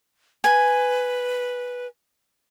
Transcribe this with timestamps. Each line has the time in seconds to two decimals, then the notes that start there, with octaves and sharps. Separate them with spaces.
0.44 B4 G#5